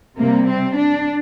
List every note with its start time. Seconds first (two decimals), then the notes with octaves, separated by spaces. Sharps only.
0.17 C3 G3 A#3
0.47 C4
0.76 D4